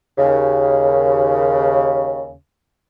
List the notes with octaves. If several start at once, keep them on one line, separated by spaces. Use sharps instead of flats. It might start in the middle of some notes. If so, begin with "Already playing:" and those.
D#2 C#3